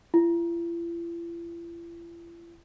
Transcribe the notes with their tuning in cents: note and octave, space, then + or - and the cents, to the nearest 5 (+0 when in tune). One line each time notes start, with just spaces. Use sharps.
E4 +45